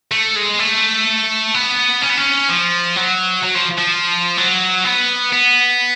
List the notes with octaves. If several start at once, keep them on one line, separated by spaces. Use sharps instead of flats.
A3
G#3
A3
B3
C#4
B3
C#4
F3
F#3
F#3
F3
F3
F#3
B3
B3